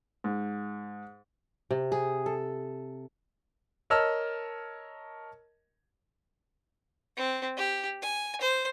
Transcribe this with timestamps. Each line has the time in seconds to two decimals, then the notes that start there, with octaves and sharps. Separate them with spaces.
0.24 G#2
1.71 C3
1.92 G#4
2.26 A4
3.90 A#4 C#5 D#5 A5 E6 F6
7.17 C4
7.57 G4
8.02 G#5
8.41 C5